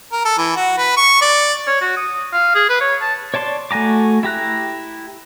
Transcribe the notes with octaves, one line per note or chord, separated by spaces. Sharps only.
A#4
A4
E3
F#4
B4
C#6
D5
C#5
F#4
D#6
F5
G#4
B4
C#5
A5
C#5 D5 A5 C6 D6
A3 F#4 G#5 A#5 D6
E4 G4 A#5 F#6